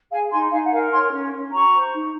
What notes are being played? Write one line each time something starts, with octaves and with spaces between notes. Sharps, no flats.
G#4 F5 G#5
D#4 G#5 C6
D#4 F5 G#5
F#5
A#4 F5 G#5
C#5 G#5 C6
C#4
C#4
F#4 A#5 C#6
C5
D#4